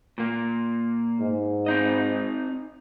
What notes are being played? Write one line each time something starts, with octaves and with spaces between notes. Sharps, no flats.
A#2 A#3
G#2
C4 D#4 D#5